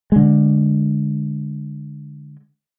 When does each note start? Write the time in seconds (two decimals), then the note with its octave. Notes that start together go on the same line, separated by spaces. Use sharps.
0.12 D3 G#3